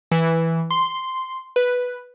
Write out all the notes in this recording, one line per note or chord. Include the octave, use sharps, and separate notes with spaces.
E3
C6
B4